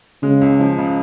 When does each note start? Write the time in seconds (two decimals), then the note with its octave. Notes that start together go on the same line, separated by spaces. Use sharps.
0.22 C#3 G#3
0.41 C#2
0.59 F3
0.78 C#3